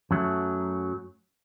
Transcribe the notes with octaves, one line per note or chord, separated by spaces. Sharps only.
F#2 F#3 A3